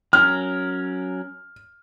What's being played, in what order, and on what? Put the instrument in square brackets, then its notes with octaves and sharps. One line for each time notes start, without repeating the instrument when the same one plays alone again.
[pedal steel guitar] F#3 C#4 A#4 [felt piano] F6